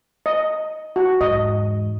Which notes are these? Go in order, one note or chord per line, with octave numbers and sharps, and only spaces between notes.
D#5
F#4
E2 G#2 D#5